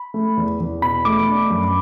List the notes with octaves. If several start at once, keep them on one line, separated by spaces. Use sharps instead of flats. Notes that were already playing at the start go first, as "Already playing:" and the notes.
Already playing: B5
A3
E2
E2
B2 B5
A3 D6
D4
F#2